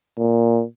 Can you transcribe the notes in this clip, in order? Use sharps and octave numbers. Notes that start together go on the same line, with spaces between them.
A#2